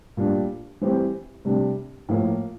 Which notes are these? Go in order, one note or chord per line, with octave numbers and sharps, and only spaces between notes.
A#2 G3 D4
E3 G3 C4 G4
C3 G3 D4
A2 F3 A#3